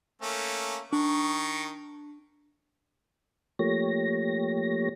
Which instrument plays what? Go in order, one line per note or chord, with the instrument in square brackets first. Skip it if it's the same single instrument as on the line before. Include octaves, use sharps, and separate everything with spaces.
[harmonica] A3 A#3 C#4
[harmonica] D#3 C#6 [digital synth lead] D4
[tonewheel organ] F3 A3 A#3 G4 C#5 A#6